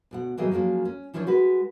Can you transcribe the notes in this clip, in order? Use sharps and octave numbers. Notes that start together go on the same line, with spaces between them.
D2 B2 F#5
A2 E3 F#3 G3 G#4 D#5
F3 F#3 G#3 A#3 C#4
C#4
E3 F3 C#4 D4 A4 C#5
G#3 F#4 B4